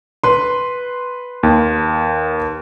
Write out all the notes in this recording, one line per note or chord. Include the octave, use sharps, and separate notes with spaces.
B4 C6
D#2